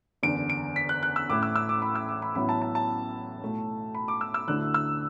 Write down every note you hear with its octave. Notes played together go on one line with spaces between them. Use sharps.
F#1 E2 D3 D7
D7
B6
F#6
F#6
E6
A1 A2 A3 E4 D6
E6
E6
D6
B5
E6
D6
B5
A1 A2 F#3 B3 E4 B5
A5
A5
A5
B1 A2 A3
B5
D6
E6
E6
D2 D3 A3 E4 F#6
E6